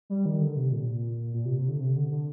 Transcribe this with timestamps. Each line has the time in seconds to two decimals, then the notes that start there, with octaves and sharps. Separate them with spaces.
0.10 G3
0.26 D#3
0.41 D3
0.57 C3
0.72 A#2
0.88 A#2
1.34 A#2
1.45 C3
1.58 C3
1.69 D3
1.80 C3
1.96 D3
2.11 D3